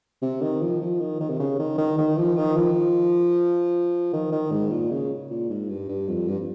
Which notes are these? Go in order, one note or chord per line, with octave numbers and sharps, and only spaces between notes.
C3
D#3
F3
F3
D#3
D#3
C3
C#3
D#3
D#3
D#3
F3
D#3
F3
D#3
D#3
G#2
A#2
C#3
A#2
G#2
G2
G2
F2
G2